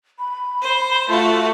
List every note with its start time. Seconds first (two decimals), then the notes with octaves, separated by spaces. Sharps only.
0.19 B5
0.61 C5
1.08 A3 F4 F#4